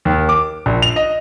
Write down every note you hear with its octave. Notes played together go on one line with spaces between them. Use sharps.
D#2
D6
A#1
F7
D#5